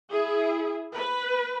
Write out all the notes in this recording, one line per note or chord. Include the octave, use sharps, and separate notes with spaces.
E4 G#4
B4